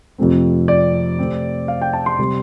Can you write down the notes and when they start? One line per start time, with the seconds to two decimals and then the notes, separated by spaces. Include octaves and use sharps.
0.18 F2 C3 F3 A3 C4
0.68 D5
1.19 C3 A3 C4
1.68 F5
1.82 G5
1.93 A5
2.06 C6
2.18 C3 G3 C4